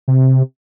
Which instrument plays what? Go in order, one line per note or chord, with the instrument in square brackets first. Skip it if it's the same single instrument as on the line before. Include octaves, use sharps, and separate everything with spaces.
[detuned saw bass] C3